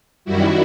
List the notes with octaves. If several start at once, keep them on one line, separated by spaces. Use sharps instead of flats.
F#2 D#3 G3 E4 F#4